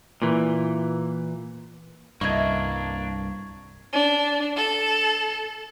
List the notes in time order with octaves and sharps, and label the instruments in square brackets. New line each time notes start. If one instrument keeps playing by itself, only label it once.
[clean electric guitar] A#2 E3
[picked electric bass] C2 G2 [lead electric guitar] A#3 D4 [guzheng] E4 D#5 [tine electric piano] C#6 G#6
[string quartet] D4
A4